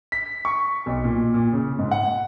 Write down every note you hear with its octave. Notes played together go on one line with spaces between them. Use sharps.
B6
C#6
B1
A#2
A#2
C#3
G#2
F#5